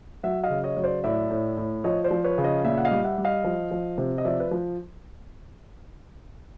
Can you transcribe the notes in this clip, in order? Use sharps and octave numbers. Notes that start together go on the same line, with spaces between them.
F#3 E5 F#5
D#5 F5
C#3
C#5 D#5
F#3 C#5
C5 D5
A2 D5 E5
A2
A2
F3 C#5 D#5
C5 D5
F3
B4 C#5
C#3
C#5 D#5
A#2 D5 E5
F#5
D#5 F5
G3
E5 F#5
G3
D#5 F5
F3
F3
C3
D#5
F3 D5 E5
B4
F3